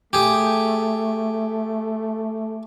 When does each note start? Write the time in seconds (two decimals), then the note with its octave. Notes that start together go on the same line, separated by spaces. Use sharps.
0.13 A3 G4 G#4